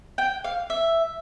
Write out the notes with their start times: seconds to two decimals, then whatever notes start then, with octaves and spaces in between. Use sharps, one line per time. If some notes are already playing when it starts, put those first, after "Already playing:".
0.18 G5
0.44 F5
0.70 E5